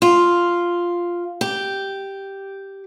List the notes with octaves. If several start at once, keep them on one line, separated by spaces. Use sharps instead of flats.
F4
G4